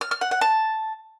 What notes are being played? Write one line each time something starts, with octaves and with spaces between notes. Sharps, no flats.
F6
F6
F#5
F#5
A5